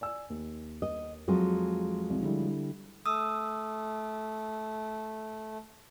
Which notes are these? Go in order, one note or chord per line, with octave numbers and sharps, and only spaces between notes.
D5 G#5 E6
D#2
D#5
F2 F3 F#3 G#3
C2
D3 G3 E4
A3 D#6 E6